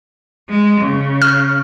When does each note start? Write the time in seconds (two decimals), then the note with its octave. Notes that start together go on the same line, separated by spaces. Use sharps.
0.49 G#3
0.80 C#3
1.22 F6